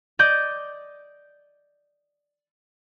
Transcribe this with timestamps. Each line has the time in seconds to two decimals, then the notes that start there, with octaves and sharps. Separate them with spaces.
0.19 D5 D#5 D6 G6